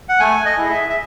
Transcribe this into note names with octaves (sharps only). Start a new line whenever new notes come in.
F#5
A3 G#5
D#5
E4 G#4
E5
E5